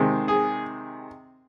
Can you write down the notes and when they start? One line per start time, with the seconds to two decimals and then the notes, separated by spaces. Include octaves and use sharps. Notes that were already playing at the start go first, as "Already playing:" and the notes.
Already playing: C3 D#3 G#3
0.28 G#4